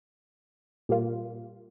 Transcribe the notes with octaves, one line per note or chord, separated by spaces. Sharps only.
A#2 G3 A#3 F4